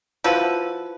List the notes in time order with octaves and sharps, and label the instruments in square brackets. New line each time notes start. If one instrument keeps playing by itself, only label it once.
[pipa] F3 E4 F#4 B4